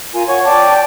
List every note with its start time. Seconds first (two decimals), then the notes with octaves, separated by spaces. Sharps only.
0.14 F4 A#4 G#5
0.28 C#5 F#5 C#6
0.45 D5 G5 A5 D6